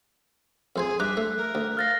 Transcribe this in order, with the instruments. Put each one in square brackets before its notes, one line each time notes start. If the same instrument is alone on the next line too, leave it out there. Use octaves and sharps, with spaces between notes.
[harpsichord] F2 C5 G#5 [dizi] G#4
[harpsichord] G2 A#5 D6 [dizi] E5 [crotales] F#6
[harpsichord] A3
[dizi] A#4
[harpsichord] D2
[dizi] F5 [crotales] F6 A6 A#6